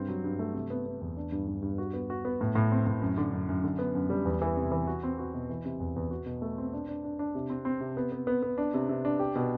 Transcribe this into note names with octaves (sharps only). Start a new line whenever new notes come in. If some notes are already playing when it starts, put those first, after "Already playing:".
Already playing: G2 C4
F#3
G2
A3
C3
B3
B3
E2
D4
G2
G2
G2
F#4
B3
F#4
B3
A2
A2
C4
A2
F#2
D3
F#2
F#2
D3
B3
F#2
G3
E2
E3
C3
E3
F#4
C4
F#4
B2
E3
C3
E2
E2
F#4
B2
A3
C4
D4
D4
D4
D4
C3
C4
C4
C3
B3
B3
B3
B3
D4
C3
C3
D4
G4
B2